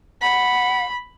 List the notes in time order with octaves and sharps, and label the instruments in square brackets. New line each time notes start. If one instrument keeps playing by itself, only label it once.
[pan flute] F#5 [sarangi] B5